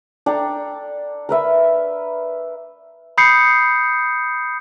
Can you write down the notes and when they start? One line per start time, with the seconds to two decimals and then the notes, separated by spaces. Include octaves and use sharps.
0.26 D4 A4 G5 A#5
1.29 A#4 B4 E5
3.18 B5 D#6 G6 C7 C#7